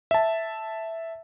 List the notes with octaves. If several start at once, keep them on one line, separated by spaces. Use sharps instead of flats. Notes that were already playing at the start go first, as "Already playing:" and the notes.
E5 A5